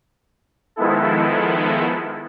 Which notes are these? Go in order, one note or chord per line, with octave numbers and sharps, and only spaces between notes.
D#3 F3 G#3 B3 E4 A4